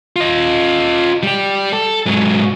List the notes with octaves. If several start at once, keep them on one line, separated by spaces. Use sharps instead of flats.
F4 D#5
G3 G4
A4
G#2 F#3